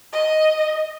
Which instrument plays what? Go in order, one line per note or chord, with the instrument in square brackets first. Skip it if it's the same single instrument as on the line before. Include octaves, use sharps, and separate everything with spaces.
[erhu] D#5